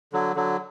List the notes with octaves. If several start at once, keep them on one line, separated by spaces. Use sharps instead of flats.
D3 F#3
D3 F#3